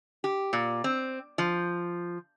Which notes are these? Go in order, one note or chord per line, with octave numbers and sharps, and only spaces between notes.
G4
A#2
C4
F3